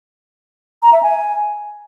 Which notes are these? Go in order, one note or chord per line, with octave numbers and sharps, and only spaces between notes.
A#5
E5
G#5